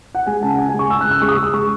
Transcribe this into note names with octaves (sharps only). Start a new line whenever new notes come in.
F#5
G#3 G#5
C#3 A5
F#5
C#3 G#5
G#5
G#3
C#6
G#3 E6
F#6
C#3
E6
G#3 C#6
D#6
E6
G#3
E6
G#3 C#6